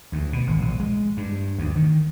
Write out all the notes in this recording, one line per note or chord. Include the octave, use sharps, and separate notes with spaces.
D2
B2
G#1
A#1
G#3
G2
D2
D#3